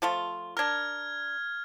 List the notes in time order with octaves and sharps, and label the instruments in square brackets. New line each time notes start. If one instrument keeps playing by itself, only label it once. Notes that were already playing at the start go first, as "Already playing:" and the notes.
[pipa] F3 A3 F4
[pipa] D4 A#4 [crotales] F6 G#6